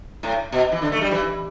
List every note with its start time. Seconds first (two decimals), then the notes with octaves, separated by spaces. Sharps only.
0.23 A2
0.52 B2
0.72 E3
0.82 D3
0.92 A3
1.01 G3
1.11 E3